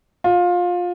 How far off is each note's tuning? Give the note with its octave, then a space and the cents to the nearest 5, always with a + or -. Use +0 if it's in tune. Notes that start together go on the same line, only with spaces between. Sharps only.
F4 +20